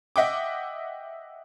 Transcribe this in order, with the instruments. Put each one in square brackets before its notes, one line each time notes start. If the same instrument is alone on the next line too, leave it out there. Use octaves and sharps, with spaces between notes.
[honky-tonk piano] D#5 E5 F#5 G5 D6